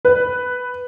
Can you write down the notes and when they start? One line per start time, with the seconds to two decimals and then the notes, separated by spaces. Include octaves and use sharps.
0.05 B4